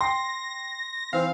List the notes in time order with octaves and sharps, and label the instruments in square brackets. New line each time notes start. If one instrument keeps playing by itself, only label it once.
[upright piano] G5 [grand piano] C6 [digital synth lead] A#6
[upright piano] E3 [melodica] C4 [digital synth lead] F5